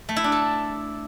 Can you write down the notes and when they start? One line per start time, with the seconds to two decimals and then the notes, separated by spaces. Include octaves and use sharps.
0.09 A3
0.16 E4
0.24 D4
0.32 A4